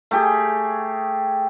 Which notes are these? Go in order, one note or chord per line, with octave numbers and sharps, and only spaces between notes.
A3 G4 G#4